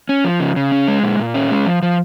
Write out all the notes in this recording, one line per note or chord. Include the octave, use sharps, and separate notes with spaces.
C#4
F3
C#3
C#3
C#4
G#3
A#2
A#2
C#4
G#3
F3
F3